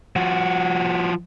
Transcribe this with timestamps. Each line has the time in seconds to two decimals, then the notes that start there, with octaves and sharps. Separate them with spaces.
0.16 F3 F#4